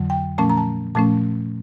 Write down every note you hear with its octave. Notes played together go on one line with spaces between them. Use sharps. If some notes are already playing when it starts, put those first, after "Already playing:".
Already playing: F2 D3 F#3
G5
A#2 F3 A3 C#4 A5
A#5
A5
A#2 F3 A3 C#4 A5